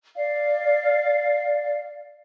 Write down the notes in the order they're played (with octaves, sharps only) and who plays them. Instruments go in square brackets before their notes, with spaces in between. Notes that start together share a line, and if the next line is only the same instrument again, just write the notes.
[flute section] D5 F5